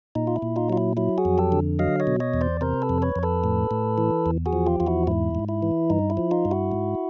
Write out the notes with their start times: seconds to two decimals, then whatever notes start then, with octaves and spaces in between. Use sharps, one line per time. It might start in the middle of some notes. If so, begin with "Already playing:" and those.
0.15 A#2 D#4
0.27 F4
0.36 E4
0.42 A#2
0.56 D#4 F4
0.70 F#3 F4
0.77 E4
0.97 F#3 E4
1.18 F#4 G#4
1.25 F2
1.38 G4 A4
1.52 D3
1.79 F#3 D#5 F5
2.00 C#5 D#5
2.07 B2
2.20 C#5 D#5
2.34 E2
2.41 C5 D5
2.61 C3 A#4 C5
2.82 A4 B4
2.89 F2
3.02 B4 C#5
3.16 F2
3.23 A4 B4
3.44 A2
3.71 A2
3.98 E3
4.26 E2
4.46 F#4 G#4
4.53 F3
4.66 F4 G4
4.80 E2 F4
4.87 E4 F#4
5.07 G#2 E4
5.35 G#2
5.49 E4
5.62 E3
5.90 G2 D#4
6.10 E4
6.17 F3
6.31 D#4 F4
6.45 G2
6.51 E4 F#4
6.72 G#2